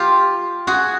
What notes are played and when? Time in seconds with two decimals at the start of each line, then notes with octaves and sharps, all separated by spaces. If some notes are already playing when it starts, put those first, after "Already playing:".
Already playing: F4 G4
0.67 F#4 G#4